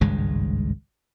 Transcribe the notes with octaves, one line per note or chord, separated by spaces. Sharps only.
G#1 C#2 G2 G#3